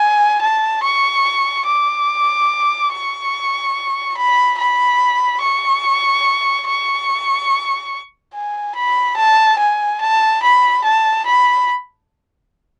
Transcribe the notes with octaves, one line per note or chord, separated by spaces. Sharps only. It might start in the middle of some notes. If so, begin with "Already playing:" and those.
Already playing: G#5
A5
C#6
D6
C#6
B5
B5
C#6
C#6
G#5
B5
A5
G#5
A5
B5
A5
B5